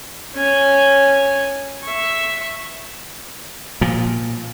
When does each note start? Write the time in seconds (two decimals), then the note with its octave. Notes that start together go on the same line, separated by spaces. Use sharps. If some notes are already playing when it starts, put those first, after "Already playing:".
0.36 C#4 G#5
1.84 E5 C#6
3.81 A#2 F3